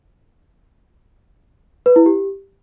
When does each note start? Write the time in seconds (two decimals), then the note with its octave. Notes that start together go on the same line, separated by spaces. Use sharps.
1.86 B4
1.96 E4
2.06 G4